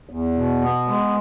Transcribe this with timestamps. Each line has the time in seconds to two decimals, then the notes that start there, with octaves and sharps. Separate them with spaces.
0.09 E2
0.36 B2
0.62 B3
0.88 G#3